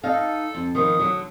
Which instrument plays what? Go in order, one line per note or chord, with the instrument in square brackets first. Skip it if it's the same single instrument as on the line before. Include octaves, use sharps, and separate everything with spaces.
[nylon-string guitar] D#4 D#5 F5 [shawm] A4
[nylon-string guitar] F2
[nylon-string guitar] D#3 F3 B3 [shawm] D#6
[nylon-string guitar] D3 F#3